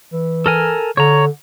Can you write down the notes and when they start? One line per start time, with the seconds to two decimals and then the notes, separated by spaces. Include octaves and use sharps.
0.13 E3
0.46 A4 A#4 G#5
0.97 D3 C#5 A#5